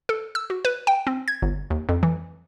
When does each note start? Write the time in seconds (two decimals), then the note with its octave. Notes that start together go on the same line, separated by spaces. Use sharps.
0.09 A4
0.35 E6
0.50 F#4
0.65 B4
0.87 G5
1.07 C4
1.28 G#6
1.42 G1
1.70 D#2
1.89 F2
2.03 E3